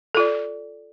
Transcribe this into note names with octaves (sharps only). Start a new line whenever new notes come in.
F4 A4 D5